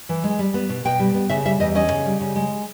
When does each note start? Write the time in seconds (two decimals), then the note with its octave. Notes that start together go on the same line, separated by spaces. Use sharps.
0.09 E3
0.24 G#3
0.39 G3
0.54 B3
0.69 B2
0.85 B2 G5
0.99 G3
1.14 B3
1.29 C#3 E5
1.45 G3 E5
1.60 E2 D#5
1.75 C#4 D#5
1.91 C#3
2.06 G3
2.21 C#3
2.36 G#3